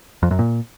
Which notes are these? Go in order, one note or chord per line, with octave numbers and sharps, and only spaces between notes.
F2
F#2
A#2